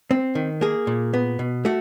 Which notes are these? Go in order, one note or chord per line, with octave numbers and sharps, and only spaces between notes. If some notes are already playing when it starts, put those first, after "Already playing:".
C4
D#3
A#3 G#4
A#2
B3
B2
A3 F#4